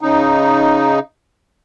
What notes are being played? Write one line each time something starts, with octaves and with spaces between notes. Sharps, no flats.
C#3 D#4